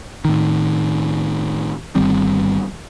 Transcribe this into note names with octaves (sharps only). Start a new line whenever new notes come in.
A2 D#3
G1 D#3 G3 C4